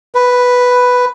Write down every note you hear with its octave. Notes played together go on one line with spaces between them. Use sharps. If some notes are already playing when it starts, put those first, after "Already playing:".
B4